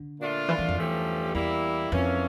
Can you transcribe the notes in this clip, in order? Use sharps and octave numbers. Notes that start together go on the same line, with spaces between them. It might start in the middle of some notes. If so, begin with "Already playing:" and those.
Already playing: D3
A#2 A3 D4 F4
E3
E3
F2
E2 G2 F3 A3 C#4 G4
E2 G3 A#3 E4
F2 E3 A#3 C#4 F4 A4